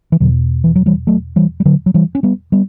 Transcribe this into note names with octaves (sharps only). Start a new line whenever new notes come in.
E3
E2 B2 D3 F#3
E3
F#3
E3 G3
F#3 A3
E3 G3
G3
D3 F#3
F#3
E3 G3
C#4
G3 B3
G3 B3